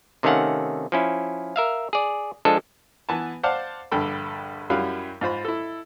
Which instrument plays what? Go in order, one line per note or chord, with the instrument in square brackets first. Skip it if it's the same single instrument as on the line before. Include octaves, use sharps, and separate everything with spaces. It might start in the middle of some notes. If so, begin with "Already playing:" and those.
[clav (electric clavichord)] C3 D#3 A3 C#4 F5 F#5
F3 C#4 E4
A#4 E5 F5
G#4 D5
F3 G#3 D4 A4
[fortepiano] E3 B3 G#5 A5
C5 D5 F5 F#5 A5
A#1 G2 D3 A4 G5 B5
F#2 F#3 G3 E4 F5 B5
G#2 F4 C5 B5
E4 A4